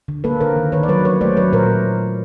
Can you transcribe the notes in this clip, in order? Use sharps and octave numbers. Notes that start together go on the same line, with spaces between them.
D3
A#3 A4 B4
D3 A#4 C5
D#3
D#3 B4 C#5
D5
F#3 B4 C#5
F#3 B4 C#5
A3 C5 D5
F#3 B4 C#5
A#2 A#4 C5